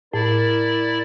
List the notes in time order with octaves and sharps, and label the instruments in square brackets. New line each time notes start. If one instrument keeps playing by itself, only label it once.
[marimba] A2 [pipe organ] E4 D5 [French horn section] A#4